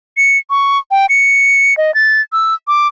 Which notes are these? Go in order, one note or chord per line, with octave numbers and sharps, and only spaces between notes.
C#7
C#6
G5
C#7
D#5
A6
E6
D6